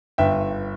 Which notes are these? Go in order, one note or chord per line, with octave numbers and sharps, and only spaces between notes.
G1 E5 G5